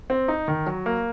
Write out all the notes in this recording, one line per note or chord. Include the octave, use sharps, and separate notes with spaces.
C4
D#4
D#3
F#3
A#3